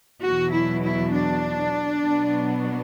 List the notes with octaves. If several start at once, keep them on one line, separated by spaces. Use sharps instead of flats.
E2 B2 F#3 F#4
E4
E4
D4
B2 F#3 B3